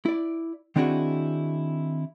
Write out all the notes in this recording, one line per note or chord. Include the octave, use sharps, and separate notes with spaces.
E4 D5
D#3 C4 D4 E4 F#4 G#4